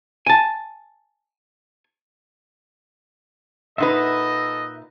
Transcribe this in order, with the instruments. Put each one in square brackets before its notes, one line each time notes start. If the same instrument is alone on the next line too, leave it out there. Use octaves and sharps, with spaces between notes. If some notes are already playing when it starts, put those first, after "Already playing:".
[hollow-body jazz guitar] G#5 A5
[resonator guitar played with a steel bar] A#2 D#4 B4 [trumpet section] A4 D#5 [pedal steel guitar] E5 F#5